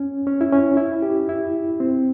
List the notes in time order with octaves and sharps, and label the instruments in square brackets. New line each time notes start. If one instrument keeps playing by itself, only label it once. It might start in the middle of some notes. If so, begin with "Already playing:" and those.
Already playing: [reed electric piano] C#4
C#4
E4
C#4
E4
G4
E4
C4